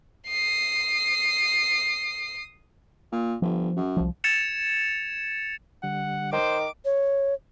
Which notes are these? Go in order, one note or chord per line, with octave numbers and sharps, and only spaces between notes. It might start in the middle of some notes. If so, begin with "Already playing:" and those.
D#6 C7
A#2
G1 F3
F#2
C2 F3
G#6 A6 C#7 E7 F7
D3 G3 F#5
D#3 C5 D6
C#5